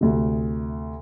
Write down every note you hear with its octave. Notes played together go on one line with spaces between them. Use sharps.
D2 C3